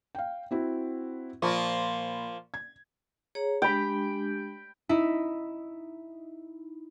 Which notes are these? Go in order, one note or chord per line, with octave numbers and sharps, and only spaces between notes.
F5 G5
C4 E4 F#4
A#2 F3 A#3 F4 B5 C#6
G#6
G#4 C#5 A#5
G#3 D4 G4 G5 B5
D#4 E4